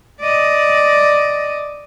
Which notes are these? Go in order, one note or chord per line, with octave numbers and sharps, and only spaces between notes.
D5 D#5